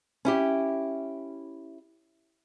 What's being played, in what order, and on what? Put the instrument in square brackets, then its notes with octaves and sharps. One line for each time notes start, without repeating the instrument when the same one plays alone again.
[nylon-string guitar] C#4 E4 G4